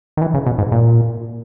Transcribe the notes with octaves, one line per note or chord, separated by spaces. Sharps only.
D#3
E3
C#3
B2
G#2
A#2